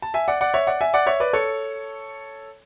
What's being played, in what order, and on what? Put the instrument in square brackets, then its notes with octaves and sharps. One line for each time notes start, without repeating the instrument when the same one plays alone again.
[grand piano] A5
E5 G#5
D5 F#5
D5 F#5
C#5 E5
D5 F#5
E5 G#5
D5 F#5
C#5 E5
B4 D5
A4 C#5